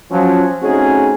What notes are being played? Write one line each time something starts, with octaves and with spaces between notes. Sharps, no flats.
F3 F#3 C#4
A3 C4 C#4 D#4 F#4 G#4